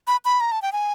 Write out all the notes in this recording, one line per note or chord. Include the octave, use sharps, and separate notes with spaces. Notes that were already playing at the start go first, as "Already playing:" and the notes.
B5
B5
A#5
A5
G5
G#5